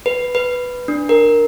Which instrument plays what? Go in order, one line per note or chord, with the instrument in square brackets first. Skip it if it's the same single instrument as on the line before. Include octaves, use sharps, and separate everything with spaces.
[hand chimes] B4
B4
D4
A#4